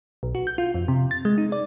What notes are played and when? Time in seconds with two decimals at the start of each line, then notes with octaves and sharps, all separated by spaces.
0.23 B1
0.35 F#4
0.47 G6
0.58 F4
0.74 F2
0.88 C3
1.11 A6
1.25 G#3
1.38 D#4
1.52 D5